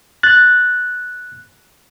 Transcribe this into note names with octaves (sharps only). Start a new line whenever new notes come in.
F#6 A6